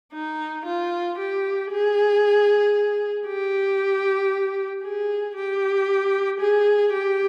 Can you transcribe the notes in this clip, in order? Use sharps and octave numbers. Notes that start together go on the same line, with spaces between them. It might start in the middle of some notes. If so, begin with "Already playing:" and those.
D#4
F4
G4
G#4
G4
G#4
G4
G#4
G4